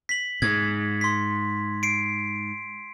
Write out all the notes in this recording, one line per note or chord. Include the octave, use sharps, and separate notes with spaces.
B6 F#7
G#2 G#6
C6 B6
C7 D7